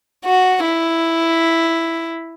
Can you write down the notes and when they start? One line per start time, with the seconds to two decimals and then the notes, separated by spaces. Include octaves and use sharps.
0.26 F#4
0.65 E4